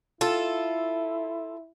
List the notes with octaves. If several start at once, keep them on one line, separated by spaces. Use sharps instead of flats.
E4 F4 A4